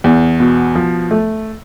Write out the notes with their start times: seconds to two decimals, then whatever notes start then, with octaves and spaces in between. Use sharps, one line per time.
0.04 E2
0.40 B2
0.75 F3
1.11 A3